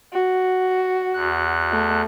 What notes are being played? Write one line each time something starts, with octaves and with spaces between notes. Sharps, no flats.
F#4
E2 F#6
A3